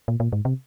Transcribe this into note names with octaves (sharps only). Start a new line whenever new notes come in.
A#2
A#2
G#2
C3